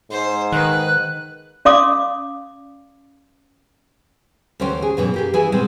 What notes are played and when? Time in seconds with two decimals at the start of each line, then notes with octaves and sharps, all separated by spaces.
0.11 G#2 C5
0.52 D#3 B4 F#6
1.65 C#4 D5 F5 C6 D6 D#6
4.60 D2 E3 C#4 C5 G5
4.82 G#4
4.97 F#2 B2 E3 C#4
5.14 A#3 G4 G#4
5.33 E3 E4 G#4 G#5
5.52 B2 G#3 C4